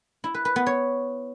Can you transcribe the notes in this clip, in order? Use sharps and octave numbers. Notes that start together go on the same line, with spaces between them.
E4
B4
B4
B3
C#5